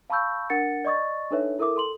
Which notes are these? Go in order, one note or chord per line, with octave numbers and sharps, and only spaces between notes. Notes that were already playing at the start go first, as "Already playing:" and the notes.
F5 A5 B5 C#6 E6 G6
D4 A#4 F#5 A6 C#7
D5 D#5 C#6 D#6 A6
D4 D#4 A4 B4 C#5 E5
E4 A4 A#4 E5 D6 D#6
A4 C6 F#7